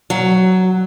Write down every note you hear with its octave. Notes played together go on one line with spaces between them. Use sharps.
F#3